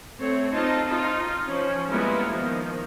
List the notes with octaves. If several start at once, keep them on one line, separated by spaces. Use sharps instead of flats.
A3 C4 C#5
C4 D#4 F4 D#5 A5
D#4 F4
F3 C#4
G3 G#3 A#3 B3 E4 F4
D#3 F3